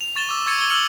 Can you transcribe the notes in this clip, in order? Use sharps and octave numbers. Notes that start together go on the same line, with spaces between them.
F7
C#6 A6 E7 G7
D6 E6
C#6 E6 G#6 A6 C#7 D#7
G#6 G7
E6 F6 C#7 F#7